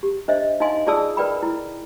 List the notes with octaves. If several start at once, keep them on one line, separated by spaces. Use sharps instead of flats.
G4
D4 C5 D#5 E5
D#4 D#5 F5 G#5 C6
F4 G#4 D5 A5 D#6 E6
A#4 B4 D5 G5 B5
E4